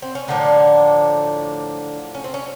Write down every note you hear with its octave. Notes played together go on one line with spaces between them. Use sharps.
C4
C#4
A2 D3 F3 A#3 D4
C#4
C4
C#4